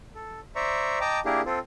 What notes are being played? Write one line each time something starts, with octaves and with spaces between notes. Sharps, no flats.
A4
C5 D5 E5 A#5 C#6
D#5 G5 A5 A#5 D6
A#3 D4 E4 G4 G#4 A#4
C4 F4 A4